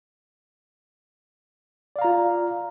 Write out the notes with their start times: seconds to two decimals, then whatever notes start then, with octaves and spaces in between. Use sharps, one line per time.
1.96 D5
1.99 F5
2.02 A#5
2.04 F4